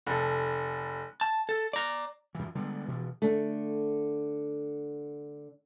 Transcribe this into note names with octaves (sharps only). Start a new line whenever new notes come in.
F1 A4
A5
A4
D5 A#5
F#2 E3
D3 G3 G#3 B3
B2 E3 F3
D3 A3